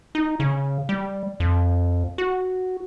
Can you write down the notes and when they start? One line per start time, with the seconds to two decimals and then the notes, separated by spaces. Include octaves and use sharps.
0.15 D#4
0.40 C#3
0.89 G3
1.40 F2
2.18 F#4